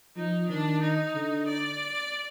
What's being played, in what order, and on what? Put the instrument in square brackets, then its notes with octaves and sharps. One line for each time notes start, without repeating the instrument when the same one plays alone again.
[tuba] F3 [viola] D#4
[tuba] D#3 [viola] D4
[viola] D#4
[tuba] D3
[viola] D5